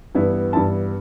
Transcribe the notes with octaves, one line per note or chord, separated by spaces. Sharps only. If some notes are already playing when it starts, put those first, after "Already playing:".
G2 E3 B3 E4
G2 E3 B3 E4 A5